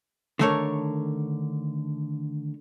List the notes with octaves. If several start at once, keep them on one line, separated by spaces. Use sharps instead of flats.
D3 D#3 A3 A4 A#4 C#5